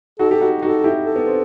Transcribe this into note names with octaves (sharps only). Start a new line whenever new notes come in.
D#4 F#4 A4
G4
D#4 F#4
D#4 F#4 A4
E4 G4
A4
B3
C4